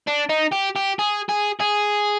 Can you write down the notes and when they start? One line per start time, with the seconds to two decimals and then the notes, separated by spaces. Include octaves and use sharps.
0.07 D4
0.29 D#4
0.52 G4
0.76 G4
0.99 G#4
1.29 G#4
1.60 G#4